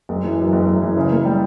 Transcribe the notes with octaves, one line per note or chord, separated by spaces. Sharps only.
F#1
E3
F#2
F#1
F#1
E3
C#3
A#3
G3